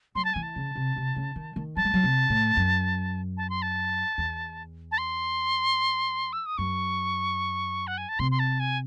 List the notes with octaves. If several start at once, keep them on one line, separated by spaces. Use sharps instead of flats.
F#3 C6
A5
E3 G#5
A5
C#3
C3
C3
C#3
D#3
D#3
F#3 A5
G#3
F#3
C3
A2
F#2
A5
C6
A5
E2
A5
C6
E6
D#6
F#2 C#6
F#5
G#5
A5
C3 C6
C6
A5
G#5